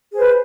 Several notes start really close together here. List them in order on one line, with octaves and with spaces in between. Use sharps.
G#4 C5 B4